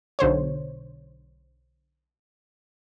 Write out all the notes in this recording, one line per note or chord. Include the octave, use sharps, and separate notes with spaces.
B1 D3 C5 C#5